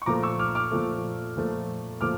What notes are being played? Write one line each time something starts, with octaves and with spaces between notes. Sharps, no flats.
C#6
A#2 F3 A3 A#5 D6
C#6 E6
D6 F6
D6 F6
A#2 F3 A3
A#2 F3 A3
A#2 F3 A3 D6 F6